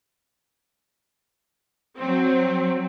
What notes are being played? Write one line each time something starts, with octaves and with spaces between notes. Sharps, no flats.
F#3 C4